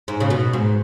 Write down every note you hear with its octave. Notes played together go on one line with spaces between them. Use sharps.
G#2
C#3
B2
G#2